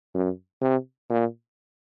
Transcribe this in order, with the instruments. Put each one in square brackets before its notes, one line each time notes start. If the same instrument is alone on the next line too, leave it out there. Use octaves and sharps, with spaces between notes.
[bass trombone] F#2
C3
A#2